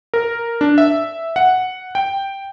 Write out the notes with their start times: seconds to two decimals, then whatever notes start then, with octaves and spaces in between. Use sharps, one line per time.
0.14 A#4
0.61 D4
0.78 E5
1.36 F#5
1.95 G5